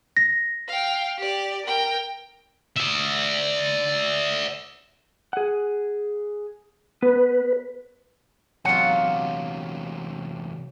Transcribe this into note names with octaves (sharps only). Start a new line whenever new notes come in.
A#6
F5 G5
G4 D5
A#4 G5
D5 E5
G#4 F#5
B3 B4
E2 C3 F#3 F4 F#5